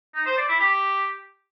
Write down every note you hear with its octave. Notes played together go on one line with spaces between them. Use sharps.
D#4
C5
D5
E4
G4